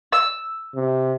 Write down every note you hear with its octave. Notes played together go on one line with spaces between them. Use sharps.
E6
C3